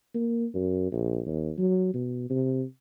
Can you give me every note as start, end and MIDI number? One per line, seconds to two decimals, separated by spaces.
0.14 0.46 58
0.54 0.92 42
0.92 1.21 34
1.26 1.52 39
1.58 1.92 54
1.94 2.26 47
2.30 2.63 48